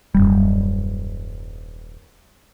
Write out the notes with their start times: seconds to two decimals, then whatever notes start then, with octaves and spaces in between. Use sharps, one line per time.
0.15 D#1 F#2 G3